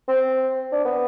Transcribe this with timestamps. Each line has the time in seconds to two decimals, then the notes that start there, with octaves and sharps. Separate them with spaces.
0.08 C4
0.72 D4
0.85 B3